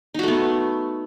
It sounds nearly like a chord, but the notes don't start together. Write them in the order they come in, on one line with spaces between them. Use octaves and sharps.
D#4 F#4 A3 B3